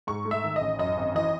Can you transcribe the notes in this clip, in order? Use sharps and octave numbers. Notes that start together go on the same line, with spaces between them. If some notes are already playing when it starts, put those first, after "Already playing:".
G#2 C#6
A3
E5
D#3
A1 D#5
F#2 D#5
G#1
E3 D#5